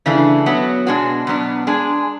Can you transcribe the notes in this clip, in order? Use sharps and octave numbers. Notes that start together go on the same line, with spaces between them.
C#3 E3 A3 D4
F#3 B3 F#4
B2 G#3 D4 F#4
B2 F#3 B3 D4
G#3 D4 G#4